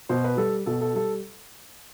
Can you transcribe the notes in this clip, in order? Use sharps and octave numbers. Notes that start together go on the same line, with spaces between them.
B2 C5
B4
G3 A4
B2 A4
A4
G3 A4